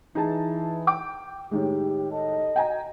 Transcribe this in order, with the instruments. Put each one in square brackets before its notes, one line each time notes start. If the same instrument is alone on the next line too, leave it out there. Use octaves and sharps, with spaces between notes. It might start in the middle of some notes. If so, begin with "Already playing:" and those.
[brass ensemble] E3 [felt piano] D#4 G#4 A5
[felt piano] G5 D6
[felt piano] A2 D#3 G#3 [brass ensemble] G4
[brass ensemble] D#4 A4 A5 [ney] D#5
[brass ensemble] F#4 [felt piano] G5 G#5 A#5